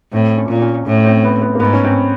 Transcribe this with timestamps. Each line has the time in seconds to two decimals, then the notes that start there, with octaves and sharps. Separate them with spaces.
0.13 A2 C4
0.37 C#4
0.49 A#2
0.62 C#4
0.86 A2 C#4
1.05 C4
1.24 B3
1.42 B3
1.55 A#3
1.60 G#2 B3
1.73 C#4
1.85 C4